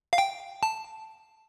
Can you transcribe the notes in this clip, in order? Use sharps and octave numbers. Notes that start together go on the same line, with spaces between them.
F5
G5
A5